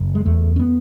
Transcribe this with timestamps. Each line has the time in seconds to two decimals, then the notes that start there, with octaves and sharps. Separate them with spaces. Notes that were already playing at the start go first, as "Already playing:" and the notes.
Already playing: F#1
0.15 G#3
0.25 E2 A3
0.56 C#4
0.59 B3